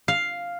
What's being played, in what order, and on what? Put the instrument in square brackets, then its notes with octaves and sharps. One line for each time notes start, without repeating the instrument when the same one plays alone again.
[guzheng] F5